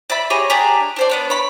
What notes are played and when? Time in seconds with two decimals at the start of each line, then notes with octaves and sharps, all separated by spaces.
0.10 D5 E5 B5
0.30 G4 G#4 C#5 D#5
0.50 D4 G4 G#4 A#5
0.96 D4 C5 D5
1.09 B3 D4 C#5
1.30 C#5 B5